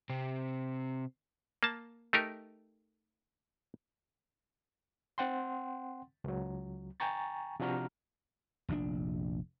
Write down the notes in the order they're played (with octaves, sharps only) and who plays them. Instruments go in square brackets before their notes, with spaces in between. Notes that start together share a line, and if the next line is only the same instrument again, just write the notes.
[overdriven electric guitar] C3 C4
[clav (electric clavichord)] A#3 A5
A3 D#4 G4 A#4
[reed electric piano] C4 F#5 G5 C6
C#2 F#3
G5 G#5 A#5 C#6 A6
C3 F3 D4 F#4 A#5 F6
[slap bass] F1 A#1 A2 D4